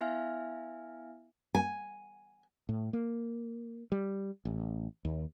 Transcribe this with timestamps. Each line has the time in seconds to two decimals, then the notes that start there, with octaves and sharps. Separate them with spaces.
0.01 B3 E4 E5 F5 G#5 F6
1.55 G#5
2.69 A2
2.93 A#3
3.92 G3
4.45 A1
5.05 D#2